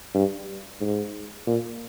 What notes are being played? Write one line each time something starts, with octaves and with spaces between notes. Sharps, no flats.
G2
G#2
A#2